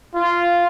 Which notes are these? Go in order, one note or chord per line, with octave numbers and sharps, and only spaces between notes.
F4